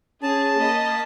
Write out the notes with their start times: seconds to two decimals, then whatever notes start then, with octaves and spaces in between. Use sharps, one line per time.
0.23 C#4 G#4 A5
0.57 A#3 D#5 B5